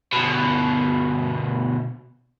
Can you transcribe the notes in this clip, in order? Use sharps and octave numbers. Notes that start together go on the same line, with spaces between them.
D2 B2